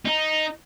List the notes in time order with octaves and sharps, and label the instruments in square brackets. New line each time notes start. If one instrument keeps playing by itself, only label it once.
[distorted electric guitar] D#4